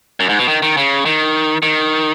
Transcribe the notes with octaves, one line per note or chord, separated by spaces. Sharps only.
F#2
G#2
B2
D#3
D#3
C#3
D#3
D#3